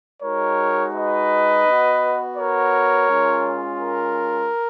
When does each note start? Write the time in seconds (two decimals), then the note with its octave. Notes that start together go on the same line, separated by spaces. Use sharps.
0.22 G#3 D#4 F#4 A#4 C#5
0.94 B4 D#5
1.65 B3 F#4
2.37 A#4 C#5
3.08 G#3 C#4 F4
3.80 A#4